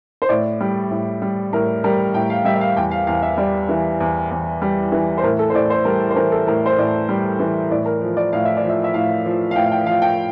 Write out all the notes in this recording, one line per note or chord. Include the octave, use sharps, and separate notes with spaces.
C5
A2 D5
G3
A2
G3
A2 A#4
G3 A#4
A2 G5
F5
G3 E5
E5
F5
E2 G5
F5
E2 F5
E5
G3 D5
E3
E2
E2
G3
E3
C5
A2 A#4
A4
C5
A2 D5
C5
G3 A#4
C5
E3 A#4
A4
A2 A#4
C5
A2 D5
G3
E3
A2 D5
A#4
F3
D5
A2 F5
E5
D5
F3
E5
E5
A2 F5
F3
F5
A2 G5
F5
G5
F3 F5
G5